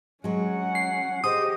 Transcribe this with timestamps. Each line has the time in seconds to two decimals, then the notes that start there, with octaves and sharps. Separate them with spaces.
0.24 F#3 G#3 C#4 F#5
0.75 C7
1.24 G4 G#4 C5 D#5 D#6